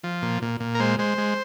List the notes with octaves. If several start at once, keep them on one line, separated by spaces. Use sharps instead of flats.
F3
A#2
A#2
A#2
A#4
G#3 C5
G#3 C5
G#3